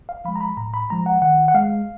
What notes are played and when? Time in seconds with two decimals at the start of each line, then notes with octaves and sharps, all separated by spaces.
0.09 F5
0.25 F3 G#3 B5
0.36 A#5
0.41 B5
0.57 A2 A#5
0.74 B5
0.90 F3 G#3 A#5
1.06 F#5
1.22 D#3 F#5
1.48 F#5
1.55 G#3 F5